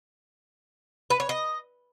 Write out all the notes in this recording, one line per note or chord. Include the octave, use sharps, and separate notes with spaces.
B4
C#5
D#5